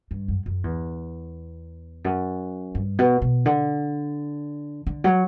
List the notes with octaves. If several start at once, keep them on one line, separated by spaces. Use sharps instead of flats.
G2
F#2
F#2
E2
F#2
G2
B2
B2
D3
D3
F#3